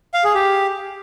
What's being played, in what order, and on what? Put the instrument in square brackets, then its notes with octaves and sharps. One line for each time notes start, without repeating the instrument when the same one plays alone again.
[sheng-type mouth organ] F5
G#4
G4